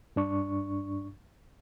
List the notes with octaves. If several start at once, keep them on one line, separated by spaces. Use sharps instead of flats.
G2 D4 C#6